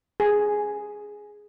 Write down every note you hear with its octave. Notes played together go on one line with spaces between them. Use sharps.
G#4